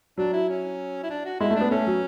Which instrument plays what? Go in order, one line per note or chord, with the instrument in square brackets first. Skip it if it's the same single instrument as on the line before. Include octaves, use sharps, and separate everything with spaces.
[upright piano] F#3 [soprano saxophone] D4
[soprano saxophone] E4
C#4
E4
D4
F#4
[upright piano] G#3 [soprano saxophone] E4
[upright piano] A3
[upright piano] B3 [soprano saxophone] D4
[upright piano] A3 [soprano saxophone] C#4
[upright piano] F#3